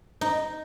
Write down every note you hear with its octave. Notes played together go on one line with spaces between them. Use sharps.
D#4